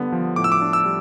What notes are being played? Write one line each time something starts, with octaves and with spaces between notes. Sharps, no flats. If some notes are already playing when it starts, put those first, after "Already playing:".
Already playing: D3 G3 B3
F3
A2 D6
E6
D6
D4
E6
G3